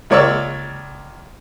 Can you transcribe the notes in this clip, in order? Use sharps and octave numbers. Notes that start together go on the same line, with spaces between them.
C#2 A#3 C#5 D5 C#6 E6